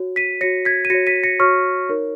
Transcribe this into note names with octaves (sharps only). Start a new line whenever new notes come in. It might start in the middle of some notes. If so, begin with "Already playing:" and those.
Already playing: F#4 C#5
B6 D#7
F#4 C#5 A#6 C#7
G#6 B6
D#7
F#4 C#5 A#6 C#7
B6 D#7
A#6 C#7
F#4 C#5 C#6 F6
D#4 A#4 C#5